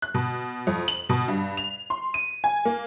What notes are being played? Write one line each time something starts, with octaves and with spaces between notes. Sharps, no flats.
F#6
B2
F2
F#7
B2
G2
F7
C6
D#7
G#5
A#3